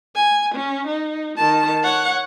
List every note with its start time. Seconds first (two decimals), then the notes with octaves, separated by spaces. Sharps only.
0.16 G#5
0.55 C#4
0.87 D#4
1.37 D#3 A5
1.83 C#5 F#5